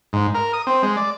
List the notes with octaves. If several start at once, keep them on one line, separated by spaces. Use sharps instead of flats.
G#2
A#4
D#6
C4
G#3
D5